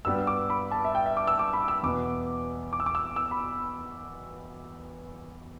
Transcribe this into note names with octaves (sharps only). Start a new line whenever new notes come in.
G2 G3 B3 E6
D6
B5
A5
E5
G5
E5
D6
E6
D6
B5
E6
E2 B2 B3 D6
D6
E6
D6
E6
E6
B5